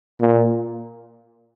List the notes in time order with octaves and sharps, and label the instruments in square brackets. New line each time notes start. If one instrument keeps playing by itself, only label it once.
[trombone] A#2